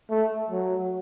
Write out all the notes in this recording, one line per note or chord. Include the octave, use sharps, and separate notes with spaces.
A3
F#3